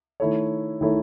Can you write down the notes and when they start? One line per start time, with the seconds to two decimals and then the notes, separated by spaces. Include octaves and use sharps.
0.20 D#3 A3 E4 A4 C#5
0.81 D#3 A3 E4 A4 C#5